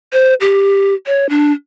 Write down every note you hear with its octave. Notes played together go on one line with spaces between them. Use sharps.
C5
G4
C#5
D4